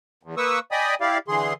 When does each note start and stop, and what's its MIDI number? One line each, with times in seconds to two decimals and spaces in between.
0.23 0.35 40
0.37 0.59 58
0.37 0.59 71
0.37 0.59 85
0.37 0.59 87
0.37 0.59 88
0.72 0.95 74
0.72 0.95 75
0.72 0.95 79
0.72 0.95 80
0.72 0.95 83
0.72 0.95 87
1.01 1.18 64
1.01 1.18 67
1.01 1.18 74
1.01 1.18 77
1.28 1.53 50
1.28 1.53 52
1.28 1.53 68
1.28 1.53 84